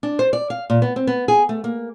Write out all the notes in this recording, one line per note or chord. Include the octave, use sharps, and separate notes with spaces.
D4
C5
D5
F5
A#2
B3
C4
B3
G#4
A3
A#3